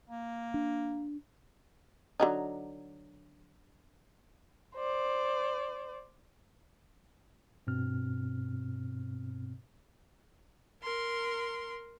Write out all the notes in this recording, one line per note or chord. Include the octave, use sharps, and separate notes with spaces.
A#3
D4
D3 F#3 D#4
C5 D5
G2 B2 C4 F6
A#4 C6